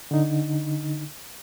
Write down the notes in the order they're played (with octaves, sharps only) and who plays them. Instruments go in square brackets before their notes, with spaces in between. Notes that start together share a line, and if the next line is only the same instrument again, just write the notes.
[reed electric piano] D3 D#4